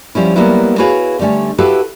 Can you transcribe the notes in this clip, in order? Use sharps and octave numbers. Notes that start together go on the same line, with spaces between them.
F3 G3 C#4 E4
F#3 G3 A#3 B3 E4 B4
E4 F#4 G#4 B4 C#5 F5
D3 G3 A3 C#4
E4 F#4 G4 A4 B4 F5